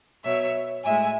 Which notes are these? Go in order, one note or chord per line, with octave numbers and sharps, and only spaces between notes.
B2 F#3 C#5 E5
A2 G#3 E5 G#5